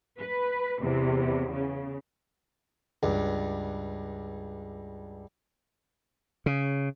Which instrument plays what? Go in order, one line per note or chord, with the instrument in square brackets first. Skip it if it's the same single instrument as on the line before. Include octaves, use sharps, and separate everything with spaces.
[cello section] B4
E2 C3
C#3
[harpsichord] C#2 G2
[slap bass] C#3